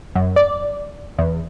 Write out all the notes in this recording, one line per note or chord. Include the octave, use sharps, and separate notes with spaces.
F#2
D5
E2